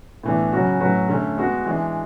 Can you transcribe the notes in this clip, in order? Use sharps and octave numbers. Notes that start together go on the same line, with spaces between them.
A2 E3 B3 D4
C#3 F#3 C#4 F#4
A2 F#3 C#4 F#4 B4
D3 A3 C#4
G#3 B3 F#4
E3 G#3 D4